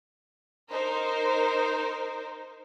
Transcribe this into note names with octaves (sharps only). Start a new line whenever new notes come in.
D#4 A#4 C5